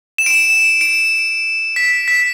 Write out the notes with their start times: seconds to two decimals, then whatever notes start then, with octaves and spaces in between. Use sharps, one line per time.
0.18 E7
0.26 D7
0.35 E7
0.50 E7
0.81 D7
1.76 B6
2.08 B6